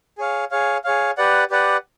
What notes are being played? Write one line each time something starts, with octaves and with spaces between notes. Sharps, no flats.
G#4 C#5 F5
G#4 C#5 F5
G#4 C#5 F5
G4 B4 D5 F#5
G4 B4 D5 F#5